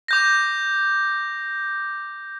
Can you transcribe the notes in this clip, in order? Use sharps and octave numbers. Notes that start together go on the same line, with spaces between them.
D6 G6 A#6